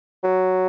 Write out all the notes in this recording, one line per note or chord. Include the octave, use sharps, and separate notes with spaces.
F#3